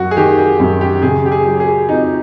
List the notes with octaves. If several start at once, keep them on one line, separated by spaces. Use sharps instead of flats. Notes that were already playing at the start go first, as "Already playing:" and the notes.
Already playing: F#2 F#3 F#4
G#4
D#3 G4
G#4
F#2
G4
C#3 G#4
G4
G#4
F#3
G#4
F2 D#4